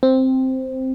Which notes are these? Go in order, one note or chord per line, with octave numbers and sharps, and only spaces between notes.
C4